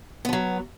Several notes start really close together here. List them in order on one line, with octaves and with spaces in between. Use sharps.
B3 F3 F#3